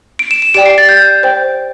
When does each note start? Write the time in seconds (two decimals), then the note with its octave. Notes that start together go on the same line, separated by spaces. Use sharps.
0.19 D7
0.31 E7
0.42 E7
0.54 G4 D5 G5 D7
0.66 C7
0.78 A6
0.89 G6
1.23 C5 G5